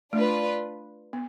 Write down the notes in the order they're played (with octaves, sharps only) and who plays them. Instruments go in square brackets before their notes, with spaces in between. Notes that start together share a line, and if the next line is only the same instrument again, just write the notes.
[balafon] A3 [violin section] D4 F4 B4
[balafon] B3